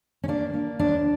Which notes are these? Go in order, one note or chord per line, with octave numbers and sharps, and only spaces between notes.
C#4
A#3 D4
A#3
D#2 D4